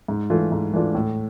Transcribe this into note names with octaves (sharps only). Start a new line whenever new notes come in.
G#2
E3 A3 D4 F4
G#2
E3 A3 D4 F4
A2